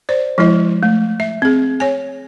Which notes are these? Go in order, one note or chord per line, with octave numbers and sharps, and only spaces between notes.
C5 D5
F3 G#3 E4 D#5
A3
E5
C4 G#4
C#5 G#5